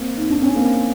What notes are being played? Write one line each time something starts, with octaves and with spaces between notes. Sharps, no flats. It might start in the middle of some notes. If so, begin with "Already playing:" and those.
Already playing: A#3 C4
D#4
D4
C#4
A#3 C4